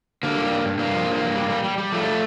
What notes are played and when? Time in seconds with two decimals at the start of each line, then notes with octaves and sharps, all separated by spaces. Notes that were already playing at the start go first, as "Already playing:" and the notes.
0.23 D3 A#3
0.36 G3
0.51 G2
0.65 G2
0.79 G2 A#3
0.94 F3
1.08 G2
1.21 G2
1.36 G3
1.50 G3
1.64 G3
1.78 G3
1.92 F3 A3